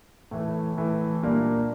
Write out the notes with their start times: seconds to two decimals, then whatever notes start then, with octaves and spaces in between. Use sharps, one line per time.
0.31 A2 E3 A3
0.77 A2 E3 A3
1.23 A#2 G3 A#3 D4